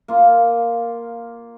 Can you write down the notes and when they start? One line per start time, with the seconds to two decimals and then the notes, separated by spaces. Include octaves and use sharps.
0.08 A#3 F4